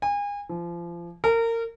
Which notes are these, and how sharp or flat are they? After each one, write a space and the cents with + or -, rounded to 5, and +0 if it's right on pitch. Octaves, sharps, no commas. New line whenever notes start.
G#5 -35
F3 -30
A#4 -25